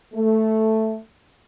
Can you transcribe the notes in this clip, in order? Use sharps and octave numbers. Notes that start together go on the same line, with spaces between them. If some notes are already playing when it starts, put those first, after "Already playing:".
A3